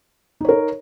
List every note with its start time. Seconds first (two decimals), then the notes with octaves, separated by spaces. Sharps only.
0.41 D#4
0.45 C#5
0.49 A#4